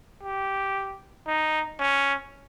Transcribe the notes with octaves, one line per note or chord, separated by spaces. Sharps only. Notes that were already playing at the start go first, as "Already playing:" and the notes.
G4
D#4
C#4